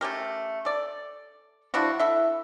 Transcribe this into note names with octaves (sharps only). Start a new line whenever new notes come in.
A3 C#4 G4 A#4
A4 D5
F3 D4 E4 F#4
E4 A4 E5